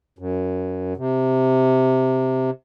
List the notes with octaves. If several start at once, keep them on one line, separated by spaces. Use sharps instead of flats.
F#2
C3